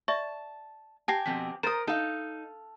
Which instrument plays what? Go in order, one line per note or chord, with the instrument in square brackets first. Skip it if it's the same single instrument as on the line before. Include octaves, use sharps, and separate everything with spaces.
[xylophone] D5 E5 C#6 [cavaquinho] A5
[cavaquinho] G4 G#5 [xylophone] A5 A#6 C7
[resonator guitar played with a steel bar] F2 B2 C4 [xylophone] B6
[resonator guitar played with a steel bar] A#4 [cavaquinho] C5 D#6 [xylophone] A#5 A6
[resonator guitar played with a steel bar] D#4 [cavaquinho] A4 F5